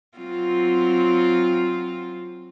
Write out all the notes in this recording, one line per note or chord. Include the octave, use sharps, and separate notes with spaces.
F#3 C4 F4